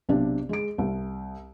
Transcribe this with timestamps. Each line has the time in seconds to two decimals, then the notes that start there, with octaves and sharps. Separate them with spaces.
0.09 B1 C3 D4
0.49 G#3 D7
0.78 C2